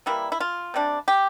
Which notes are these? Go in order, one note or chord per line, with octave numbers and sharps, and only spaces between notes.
E3 G3 A#3 E4
E4
F4
C3 G3 D4
G4